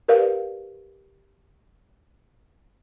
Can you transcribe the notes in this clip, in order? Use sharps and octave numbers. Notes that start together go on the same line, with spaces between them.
G4 A#4 B4 D5 F5